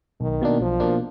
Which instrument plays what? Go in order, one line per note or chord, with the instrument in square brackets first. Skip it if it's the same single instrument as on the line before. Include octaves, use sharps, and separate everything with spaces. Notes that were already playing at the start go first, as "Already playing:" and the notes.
[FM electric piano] B1 [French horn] D#3
[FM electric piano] B2 A#3 D4
[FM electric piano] B1 [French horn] F3
[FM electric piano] B2 A#3 D4